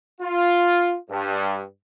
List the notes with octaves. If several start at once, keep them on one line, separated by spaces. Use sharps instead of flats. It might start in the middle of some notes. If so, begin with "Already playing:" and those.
F4
G2